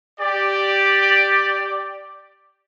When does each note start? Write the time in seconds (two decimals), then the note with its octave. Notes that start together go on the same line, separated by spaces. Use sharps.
0.20 G4 D5